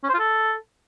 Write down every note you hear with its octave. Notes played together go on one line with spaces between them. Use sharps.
C#4
C5
F4
A4